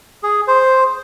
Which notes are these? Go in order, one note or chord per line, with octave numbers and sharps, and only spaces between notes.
G#4
C5